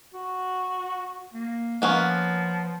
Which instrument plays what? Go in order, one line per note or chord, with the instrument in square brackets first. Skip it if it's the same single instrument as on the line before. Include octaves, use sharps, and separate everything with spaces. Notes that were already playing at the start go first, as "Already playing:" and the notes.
[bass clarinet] F#4
A#3
[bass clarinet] F3 [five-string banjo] A#3 B3 C#4